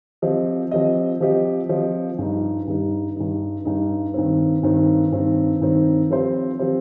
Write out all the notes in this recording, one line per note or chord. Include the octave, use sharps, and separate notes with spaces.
F3 C4 G4 D#5
F3 C4 G4 D#5
F3 C4 G4 D#5
F3 C4 G4 D#5
G2 G3 D#4
G2 G3 D#4
G2 G3 D#4
G2 G3 D#4
G2 D#3 C4
G2 D#3 C4
G2 D#3 C4
G2 D#3 C4
F3 C4 G4 C5
F3 C4 G4 C5